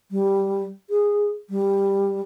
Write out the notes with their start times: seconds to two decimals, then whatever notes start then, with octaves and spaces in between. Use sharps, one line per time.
0.11 G3
0.90 G#4
1.50 G3